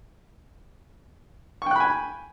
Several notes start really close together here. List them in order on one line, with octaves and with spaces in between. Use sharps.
C#6 G5 F#6 B5 G#5